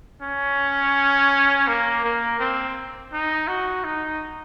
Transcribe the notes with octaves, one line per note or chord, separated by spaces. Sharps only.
C#4
A#3
A#3
C4
D#4
F#4
D#4